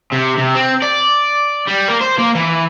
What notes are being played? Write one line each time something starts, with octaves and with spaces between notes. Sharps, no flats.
C3
C3
C4
D5
G3
A#3
C5
A#3
E3